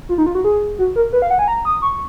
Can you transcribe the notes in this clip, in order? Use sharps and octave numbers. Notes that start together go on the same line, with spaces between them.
F4
D#4
F4
F#4
G#4
F#4
A#4
B4
F5
F#5
G#5
A#5
D#6
C#6